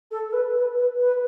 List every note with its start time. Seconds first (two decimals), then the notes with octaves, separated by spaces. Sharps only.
0.11 A4
0.28 A4
0.33 B4
0.55 B4
0.76 B4
0.99 B4